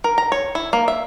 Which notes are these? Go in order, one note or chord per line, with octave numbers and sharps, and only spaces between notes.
A#4
A#5
C#5
E4
A#3
E5